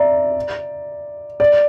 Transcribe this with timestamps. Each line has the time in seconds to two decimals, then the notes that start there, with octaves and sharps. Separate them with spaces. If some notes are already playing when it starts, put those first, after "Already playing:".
Already playing: D5 E5 A#5
1.40 D5